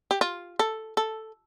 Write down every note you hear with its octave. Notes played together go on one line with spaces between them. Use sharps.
G4
F4
A4
A4